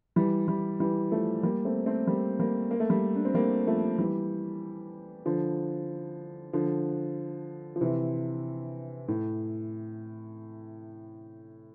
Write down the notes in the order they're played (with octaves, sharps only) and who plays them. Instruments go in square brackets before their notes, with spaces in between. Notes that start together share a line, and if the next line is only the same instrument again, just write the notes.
[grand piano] E3 G3
E3 G3
E3 G3
F3 A3
G3 A#3
A3 C4
A3 C4
G3 A#3
G3 A#3
A#3
A3
G3 A#3
D4
C4
G3 A#3
F3 A3
E3 G3
D3 F3
D3 F3
F3
C3 E3
A2